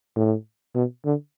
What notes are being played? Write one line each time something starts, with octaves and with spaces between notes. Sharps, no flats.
A2
B2
D3